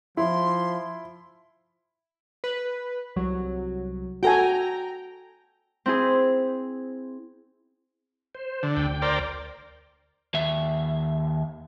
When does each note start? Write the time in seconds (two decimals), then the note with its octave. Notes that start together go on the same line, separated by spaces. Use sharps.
0.17 F3 E4 C6
2.44 B4
3.16 C2 F#3
4.23 F#4 A4 G5 G#5 A#5
5.86 C4 E4 G#4
8.35 C5
8.63 D3
8.77 D2 G5
9.02 A#4 C5 D5
10.34 D#2 E5